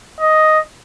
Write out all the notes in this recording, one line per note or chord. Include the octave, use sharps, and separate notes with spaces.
D#5